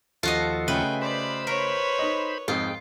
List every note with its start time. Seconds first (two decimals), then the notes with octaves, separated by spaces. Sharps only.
0.23 D#2 F3 F4 F#4 A4 D#5 F5
0.68 C#3 A3 B4 G5 G#5
1.02 C5 D5 B5
1.47 A#4 B4 C#5
1.99 D#4 D#5
2.48 F2 G#2 F4 G5